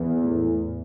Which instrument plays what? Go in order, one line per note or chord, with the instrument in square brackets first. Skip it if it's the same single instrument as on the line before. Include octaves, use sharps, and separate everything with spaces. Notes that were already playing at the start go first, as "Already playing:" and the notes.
Already playing: [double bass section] E2
[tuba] A2